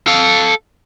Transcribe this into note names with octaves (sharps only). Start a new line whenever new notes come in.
A4 F5